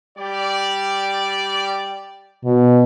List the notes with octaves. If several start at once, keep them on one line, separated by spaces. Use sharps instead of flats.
G3 G4 D5
B2